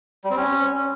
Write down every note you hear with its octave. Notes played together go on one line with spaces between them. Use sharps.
G3
C4
C#4